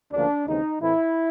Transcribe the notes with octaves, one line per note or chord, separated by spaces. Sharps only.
D2 C#3 F3 A#3 D4
D#2 C#3 E3 G#3 C4 D#4
A2 E3 A3 C4 E4